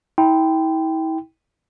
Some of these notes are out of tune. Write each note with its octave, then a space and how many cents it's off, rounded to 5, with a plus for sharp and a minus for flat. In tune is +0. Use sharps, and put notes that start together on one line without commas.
E4 -40 G5 +0 C6 -35